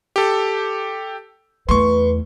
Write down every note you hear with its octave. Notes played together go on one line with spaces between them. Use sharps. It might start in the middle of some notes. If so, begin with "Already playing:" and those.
G4 A4
E2 A3 B4 C6 C#6